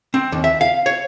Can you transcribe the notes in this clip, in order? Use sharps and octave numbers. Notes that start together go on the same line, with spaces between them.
C4
D#2
E5
F5
C#5